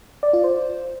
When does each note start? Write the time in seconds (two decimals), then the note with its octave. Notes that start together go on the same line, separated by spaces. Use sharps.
0.23 D5
0.33 F4
0.44 C5